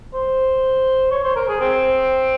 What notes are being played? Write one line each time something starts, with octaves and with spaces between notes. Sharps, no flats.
C5
C#5
C5
A#4
G#4
C4